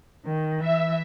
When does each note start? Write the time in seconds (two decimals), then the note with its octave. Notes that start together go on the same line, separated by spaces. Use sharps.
0.25 D#3
0.60 E3 E5